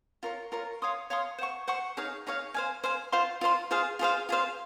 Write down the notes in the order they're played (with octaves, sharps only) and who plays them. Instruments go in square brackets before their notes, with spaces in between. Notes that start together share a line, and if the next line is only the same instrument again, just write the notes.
[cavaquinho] F4 A#4 C#5
F4 A#4 C#5
C#5 F5 C6 D#6
C#5 F5 C6 D#6
C5 F#5 C#6
C5 F#5 C#6
D#4 G#4 C#5 F5
D#4 G#4 C#5 F5
C5 F5 G#5
C5 F5 G#5
F4 C5 F5 C6
F4 C5 F5 C6
F4 G#4 C5 F5
F4 G#4 C5 F5
F4 G#4 C5 F5